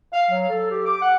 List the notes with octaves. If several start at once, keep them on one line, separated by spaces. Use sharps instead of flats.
F5
F#3
A4
G4
D6
F#5